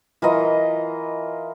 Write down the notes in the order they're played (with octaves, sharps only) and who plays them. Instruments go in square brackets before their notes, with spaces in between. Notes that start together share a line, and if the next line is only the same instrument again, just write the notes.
[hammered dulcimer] E3 F4 A#4 D#5